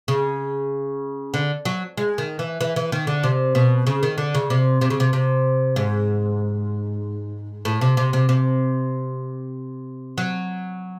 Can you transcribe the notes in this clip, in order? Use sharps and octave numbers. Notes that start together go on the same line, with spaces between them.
C#3
D3
F#3
G#3
D#3
E3
E3
E3
D#3
D3
C3
B2
C#3
D#3
D3
C#3
C3
C3
C#3
C3
C3
G#2
A2
C3
C3
C3
C3
F#3